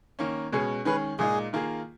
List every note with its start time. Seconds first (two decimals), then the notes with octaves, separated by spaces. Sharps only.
0.19 D#3 A#3 C#4
0.52 B2 G#3 C#4 G#4
0.85 D#3 G#3 C#4 G#4 B4
1.19 A#2 G#3 D#4 G#4
1.53 D#3 A#3 F4 G#4